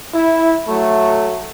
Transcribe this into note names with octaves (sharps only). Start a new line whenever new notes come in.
E4
F#3 A3